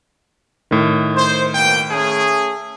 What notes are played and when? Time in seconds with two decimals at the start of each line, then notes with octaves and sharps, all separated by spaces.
0.71 A2 D#3
1.14 C5
1.53 B2 A#3 G5
1.91 A3 C#4 G#4